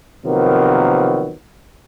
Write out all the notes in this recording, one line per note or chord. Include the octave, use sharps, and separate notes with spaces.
C3 D#3 F3 F#3 A#3 B3